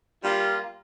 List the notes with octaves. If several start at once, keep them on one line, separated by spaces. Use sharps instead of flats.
G3 A#3 F4